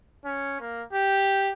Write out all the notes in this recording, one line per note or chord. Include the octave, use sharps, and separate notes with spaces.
C#4
A#3
G4